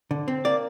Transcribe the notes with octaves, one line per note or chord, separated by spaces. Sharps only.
D3
C4
A#3 D5